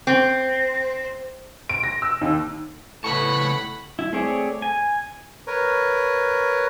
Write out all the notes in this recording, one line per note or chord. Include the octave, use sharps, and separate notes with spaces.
C4
D7
A#6
E6
D#2
A2 C#3 B4 F#5 A5 B5 C#6
E4
A3 C4 G#4 C#5 D5
G#5
A#4 B4 C#5